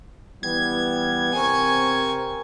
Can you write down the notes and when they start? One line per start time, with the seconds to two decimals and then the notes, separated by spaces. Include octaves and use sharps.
0.43 E3 G3 B3 G#6
1.34 C3 C4 A#4 G#5 C#6